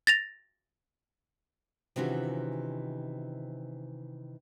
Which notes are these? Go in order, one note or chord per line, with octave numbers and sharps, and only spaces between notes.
A6 A#6 F7
C3 D#3 E3 C#4 F4 F#4